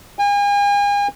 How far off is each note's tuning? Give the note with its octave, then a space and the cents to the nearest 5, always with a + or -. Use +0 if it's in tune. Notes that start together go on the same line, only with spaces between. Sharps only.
G#5 -40